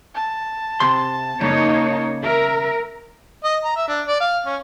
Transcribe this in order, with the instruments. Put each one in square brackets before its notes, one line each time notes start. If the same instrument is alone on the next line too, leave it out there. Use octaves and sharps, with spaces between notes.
[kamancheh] A5
[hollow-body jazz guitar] C3 C6
[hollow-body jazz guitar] C#3 [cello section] A#3 D#4 C#5
[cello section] A#4 [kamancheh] E5
[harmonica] D#5
A#5
E5
D4
D5
F5
C#4